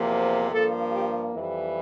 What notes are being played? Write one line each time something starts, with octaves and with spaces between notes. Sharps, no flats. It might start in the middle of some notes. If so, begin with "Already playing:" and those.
Already playing: E2 C3 F3 A#3
G2 F3 A#3 A4
G4
F2 E3 G3